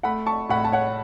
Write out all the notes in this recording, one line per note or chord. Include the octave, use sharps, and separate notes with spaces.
A3 F#5 B5
A5 C#6
A2 F#5 B5
A5
C#5 F#5